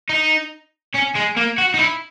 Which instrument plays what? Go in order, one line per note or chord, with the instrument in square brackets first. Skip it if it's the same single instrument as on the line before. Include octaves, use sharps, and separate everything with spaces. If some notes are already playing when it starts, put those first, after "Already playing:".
[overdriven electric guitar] D#4
C#4
G#3
A#3
F#4
D#4
E4